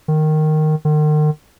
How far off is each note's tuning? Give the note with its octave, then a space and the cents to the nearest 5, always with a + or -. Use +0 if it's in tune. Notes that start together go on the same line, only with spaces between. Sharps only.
D#3 -10
D#3 -40